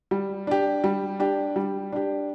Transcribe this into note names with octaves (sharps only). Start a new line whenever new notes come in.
G3
D4 G4
G3
D4 G4
G3
D4 G4